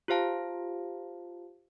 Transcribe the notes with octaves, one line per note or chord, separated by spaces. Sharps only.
F4 G4 C5 F5 A5